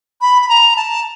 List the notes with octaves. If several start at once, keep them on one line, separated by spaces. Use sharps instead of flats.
B5
B5
A#5
A5